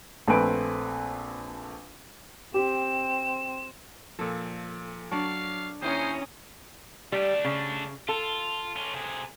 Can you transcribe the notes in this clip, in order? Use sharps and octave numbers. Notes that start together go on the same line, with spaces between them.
A#1 A3 C4 B4 G#5 D7
C4 G4 E7
A#2 F3 A4
F#3 D4 C#5 D5 F5 A5 C#6
D#2 C#4 E4 C5 A#5 D#6
G3 A3 D4
C#3
F4 A4
C#4 F4
C3 G#4